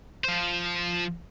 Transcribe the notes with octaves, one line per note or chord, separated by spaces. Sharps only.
F3 C5